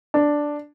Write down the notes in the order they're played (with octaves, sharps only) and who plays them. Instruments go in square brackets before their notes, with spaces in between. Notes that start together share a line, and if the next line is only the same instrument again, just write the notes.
[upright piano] D4